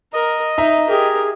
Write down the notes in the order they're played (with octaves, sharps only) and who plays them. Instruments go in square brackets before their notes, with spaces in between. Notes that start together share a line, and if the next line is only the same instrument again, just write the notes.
[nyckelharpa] A#4 [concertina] D#5
[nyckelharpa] D#4 [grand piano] E5 A#5
[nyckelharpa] G4 A#4 [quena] G#4